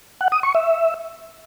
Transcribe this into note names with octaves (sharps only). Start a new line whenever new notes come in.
F#5
D#6
C#6
E5